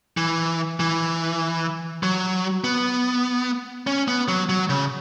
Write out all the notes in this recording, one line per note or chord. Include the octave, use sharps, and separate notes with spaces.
E3
E3
F#3
B3
C#4
B3
F#3
F#3
C#3